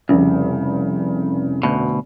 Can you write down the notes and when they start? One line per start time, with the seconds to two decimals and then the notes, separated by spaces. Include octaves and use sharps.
0.09 F1 C2 C#3
1.63 D2 B2